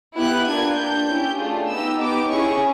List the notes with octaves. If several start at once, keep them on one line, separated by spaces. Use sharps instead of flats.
B3 E4 G4 F#6
A#3 D4 F4 G#6
D4 G4 G6
C#4 E4 G4
A3 D4 F4 G#4
B3 D#4 G4 E6
B3 D#4 G4 D6
C#4 E4 G#4 C#6